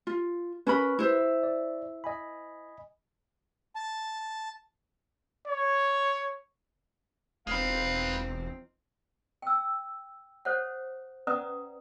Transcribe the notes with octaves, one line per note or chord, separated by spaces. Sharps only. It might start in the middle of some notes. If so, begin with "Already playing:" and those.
F4
C#4 A#4 B4 B5
E4 C5
D5
D#5 G#5 B5
A5
C#5
E1 F3 G#3 C4 D#4 B4 F5
G5 E6
A4 C5 C#5 F#5
C#4 B4 D5 F#5 A#5 D#6